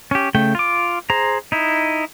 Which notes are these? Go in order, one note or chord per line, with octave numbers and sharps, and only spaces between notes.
C#4 G4
C#3 A3 G5
F4 D6
G#4 C5 A#5
D#4 E4